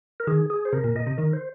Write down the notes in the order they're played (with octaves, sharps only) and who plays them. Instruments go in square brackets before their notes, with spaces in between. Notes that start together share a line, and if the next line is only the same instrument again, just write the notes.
[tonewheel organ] A#4
[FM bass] D#3 [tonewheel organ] G#4
[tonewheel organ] G#4
C5
[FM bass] C3 [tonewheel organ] A#4
[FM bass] A#2
[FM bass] A#2 [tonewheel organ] D#5
[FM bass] C3
[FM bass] D#3 [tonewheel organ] A#4
[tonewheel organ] C5